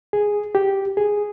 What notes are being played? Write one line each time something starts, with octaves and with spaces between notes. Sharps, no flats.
G#4
G4
G#4